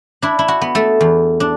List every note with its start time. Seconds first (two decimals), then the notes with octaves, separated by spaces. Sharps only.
0.22 D4 E4
0.39 E4
0.48 F#4
0.61 B3
0.75 A3 A4
1.01 E2
1.40 D4